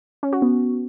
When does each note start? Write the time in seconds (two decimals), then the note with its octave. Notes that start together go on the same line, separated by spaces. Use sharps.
0.23 C#4
0.33 F#4
0.42 B3